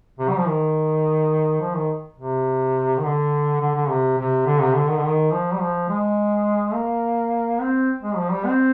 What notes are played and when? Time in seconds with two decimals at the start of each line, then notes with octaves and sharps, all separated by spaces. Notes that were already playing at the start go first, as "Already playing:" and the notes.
0.19 C3
0.29 G3
0.39 F3
0.47 D#3
1.61 F3
1.75 D#3
2.18 C3
2.98 D#3
3.04 D3
3.61 D3
3.75 D3
3.89 C3
4.18 C3
4.46 D3
4.61 C3
4.75 D3
4.89 D#3
4.97 D3
5.03 D#3
5.32 F3
5.52 G3
5.61 F3
5.89 G#3
6.74 A#3
7.60 C4
8.02 G#3
8.17 F3
8.31 G3
8.46 C4